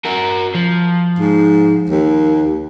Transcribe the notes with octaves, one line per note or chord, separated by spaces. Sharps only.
F#4 A#4
F3
G#2
D#2